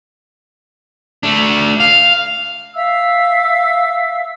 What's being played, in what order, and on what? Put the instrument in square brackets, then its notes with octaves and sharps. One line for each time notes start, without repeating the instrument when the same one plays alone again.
[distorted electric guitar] A3 D4
F5
[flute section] E5 F5 E6